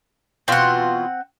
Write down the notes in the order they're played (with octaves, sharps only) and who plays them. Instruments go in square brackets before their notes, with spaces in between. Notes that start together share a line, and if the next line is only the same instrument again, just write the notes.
[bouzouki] B2 E3 F4 [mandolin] C4 F#5